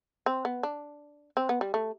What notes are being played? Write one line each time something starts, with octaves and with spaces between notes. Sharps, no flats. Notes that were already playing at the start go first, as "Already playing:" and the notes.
C4
B3
D4
C4
B3
G3
A3